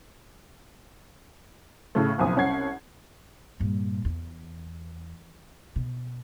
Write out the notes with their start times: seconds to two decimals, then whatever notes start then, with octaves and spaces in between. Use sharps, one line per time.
1.95 A2 C#3 A3
2.18 F#1 B1 F2 G#5 D#6
2.36 C2 C#4 F#5 G#6 C7
3.60 G2 A#2
4.05 E2
5.76 B2